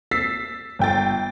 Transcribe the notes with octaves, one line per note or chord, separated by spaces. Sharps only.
E6 A6 B6 C7
G1 G5 A6